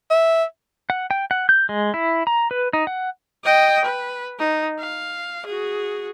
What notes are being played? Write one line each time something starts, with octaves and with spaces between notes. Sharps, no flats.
E5
F#5
G5
F#5
G6
G#3
E4
A#5
B4
D#4
F#5
D#5 G5
B4
D#4
F5
F#4 G#4